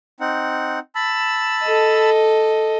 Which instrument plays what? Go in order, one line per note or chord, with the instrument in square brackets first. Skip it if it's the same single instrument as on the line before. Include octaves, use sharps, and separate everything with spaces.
[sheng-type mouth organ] C4 D#4 F#5
A5 B5 E6
[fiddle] A4 D#5